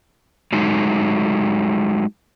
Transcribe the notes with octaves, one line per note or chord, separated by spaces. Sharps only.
F#3 G#3 A3 D#4